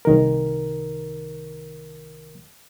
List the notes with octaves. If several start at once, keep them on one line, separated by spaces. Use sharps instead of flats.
C2 D#3 A#4